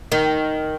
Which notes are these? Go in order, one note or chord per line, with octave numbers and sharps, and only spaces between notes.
D#3